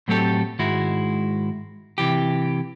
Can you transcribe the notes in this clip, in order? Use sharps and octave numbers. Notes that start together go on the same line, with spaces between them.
A2 F#3 A3 C4 G4 A4
G#2 D#3 G#3 E4 F#4
C3 E3 G4